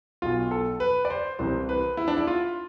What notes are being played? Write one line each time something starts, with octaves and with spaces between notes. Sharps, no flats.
B1 B2 F4
A4
B4
D5
C5
C2 C3 E3 C5
B4
E4
D4
E4
F4